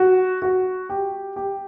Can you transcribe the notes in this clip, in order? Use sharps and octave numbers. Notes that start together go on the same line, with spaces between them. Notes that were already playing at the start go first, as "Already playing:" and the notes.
Already playing: F#4
F#4
G4
G4